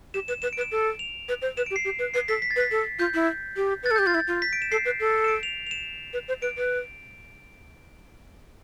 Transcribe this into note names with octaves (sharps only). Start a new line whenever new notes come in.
G4 E7
B4 E7
B4 E7
D7
B4
E7
A4
F7
B4
C5
B4 E7
G4 D7
C7
G4
B4
B4 C7
A4 B6
B6
A6
B4
B6
A4
F4 G6
E4
G4
B4
A6
A4
G4 G6
F4 A6
E4
F4
B6
D7
E7
A4 C7
B4
A4
E7
D7
F7
F7
E7
B4
C5
B4 D7
B4